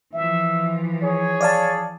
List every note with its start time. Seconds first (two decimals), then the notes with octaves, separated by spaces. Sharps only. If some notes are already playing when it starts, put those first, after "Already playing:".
0.14 E3 F3 E5
1.03 G#4 C#5
1.41 D5 F5 A5